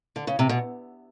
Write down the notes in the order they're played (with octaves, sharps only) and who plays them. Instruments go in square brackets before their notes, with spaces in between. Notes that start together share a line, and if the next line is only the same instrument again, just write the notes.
[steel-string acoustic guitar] D3
C#3
C3
B2